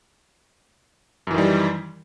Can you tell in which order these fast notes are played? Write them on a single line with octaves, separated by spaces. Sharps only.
F#2 E3 D#3 G3